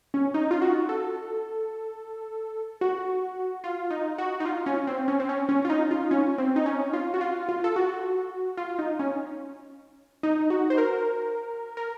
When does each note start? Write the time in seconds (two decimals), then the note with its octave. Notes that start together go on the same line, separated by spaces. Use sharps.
0.14 C#4
0.34 D#4
0.51 F4
0.62 F#4
0.89 A4
2.81 F#4
3.64 F4
3.90 D#4
4.18 F#4
4.40 D#4
4.46 F4
4.66 C#4
4.87 C4
5.08 C#4
5.20 C4
5.29 C#4
5.49 C#4
5.65 F4
5.70 D#4
5.91 F4
6.11 C#4
6.38 C4
6.56 D#4
6.66 C#4
6.93 F4
7.14 F#4
7.21 F4
7.49 F4
7.64 A4
7.76 F#4
8.57 F4
8.79 D#4
8.99 C#4
10.23 D#4
10.50 F#4
10.70 C5
10.78 A#4
11.77 A#4